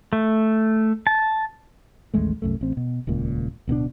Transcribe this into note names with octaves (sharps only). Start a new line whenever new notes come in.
A3
A5
A1 D#2 G#3 A3
C2 F#2 A3
A1 C4
B2
D#1 C#2 A#2
D1 B2 G#3 D4